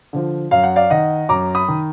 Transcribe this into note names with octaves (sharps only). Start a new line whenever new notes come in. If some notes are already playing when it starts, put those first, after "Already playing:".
D3 F3
F#2 F5
F#5
D5 F5
D#3 D#5 F#5
F#2 A#5 D6
B5 D#6
D#3